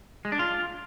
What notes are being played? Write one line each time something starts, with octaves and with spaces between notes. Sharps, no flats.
G#3
D4
F4